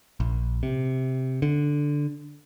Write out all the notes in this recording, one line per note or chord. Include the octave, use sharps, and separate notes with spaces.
A#1
C3
D3